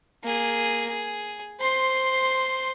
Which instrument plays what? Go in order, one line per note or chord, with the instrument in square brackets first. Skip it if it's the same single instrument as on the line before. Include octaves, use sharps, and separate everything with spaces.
[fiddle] A#3 G#4
G#4
C5 C6